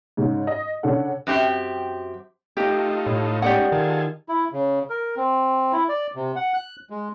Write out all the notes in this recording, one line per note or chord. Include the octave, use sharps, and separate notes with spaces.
G#2 C#3
D#5
C#3 C#4 D4 A4 F#5
F#2 C4 G4 E5
A3 D#4 F4 G4 D#5
A2
G#3 C#4 D#4 G4 D5 F#5
D#3 F4 G#4 A4
E4
C#3
A#4
C4
E4
D5
C3
F#5
F#6
G#3